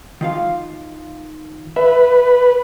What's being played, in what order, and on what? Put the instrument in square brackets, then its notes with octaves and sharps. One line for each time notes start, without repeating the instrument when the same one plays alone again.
[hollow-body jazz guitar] D#3 F4 F5
[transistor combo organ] B4 [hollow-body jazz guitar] E5